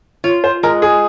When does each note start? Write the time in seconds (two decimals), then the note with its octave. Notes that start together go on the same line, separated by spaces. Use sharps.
0.24 F4 C#5
0.44 C5
0.63 G#3 A#4
0.82 G#4